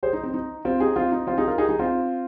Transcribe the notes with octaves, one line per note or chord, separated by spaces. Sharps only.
G#4 C5
D#4
C4
D#4
C4 F4
D#4 G#4
C4 F4
D#4
C4 F4
D#4 G#4
F4 A#4
D#4 G#4
D#4 G#4
C4 F4